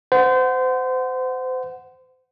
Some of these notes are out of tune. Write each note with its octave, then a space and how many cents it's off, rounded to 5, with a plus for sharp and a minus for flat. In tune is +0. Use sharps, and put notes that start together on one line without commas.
C5 -30 F#5 +0